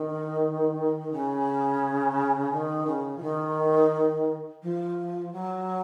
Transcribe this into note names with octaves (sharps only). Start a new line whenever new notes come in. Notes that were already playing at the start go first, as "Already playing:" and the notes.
Already playing: D#3
C#3
D#3
C#3
F3
D#3
F3
F#3